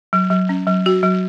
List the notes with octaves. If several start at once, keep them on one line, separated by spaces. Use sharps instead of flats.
F#3
F#3
C#4
F#3
F#4
F#3